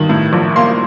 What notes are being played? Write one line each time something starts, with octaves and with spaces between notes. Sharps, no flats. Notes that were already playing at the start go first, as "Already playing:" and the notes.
Already playing: G2 D#3
A2
A#1
A#3 C6